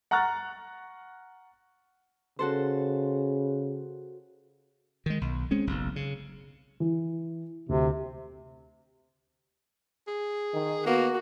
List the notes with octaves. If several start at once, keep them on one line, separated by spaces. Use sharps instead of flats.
F#5 A#5 C#6 F6 F#6 A6
C#3 F#4 A4 C5
D#3 G#3
B1
G#3 C4 C#4
F#1 B1
C#3
E3
D2 C3
G#4
D#3
A#3 B3 F#4